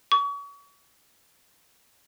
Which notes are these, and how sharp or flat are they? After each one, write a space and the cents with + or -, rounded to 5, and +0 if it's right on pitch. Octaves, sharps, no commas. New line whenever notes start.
C#6 +35